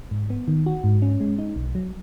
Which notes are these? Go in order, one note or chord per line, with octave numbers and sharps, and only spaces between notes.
G#2
B3
D#3
F#4
G#2
C#4
G#3
D#4
B1
F#3